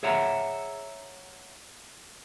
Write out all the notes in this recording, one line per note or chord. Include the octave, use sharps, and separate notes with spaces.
G#4 C#5 E5 F#5 A#5